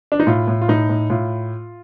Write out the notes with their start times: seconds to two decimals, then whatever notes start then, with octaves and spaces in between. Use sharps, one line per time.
0.12 D4
0.20 D#4
0.27 A2 F4
0.48 A2
0.61 F4
0.69 A2 D#4
0.89 A2
1.10 A2 F4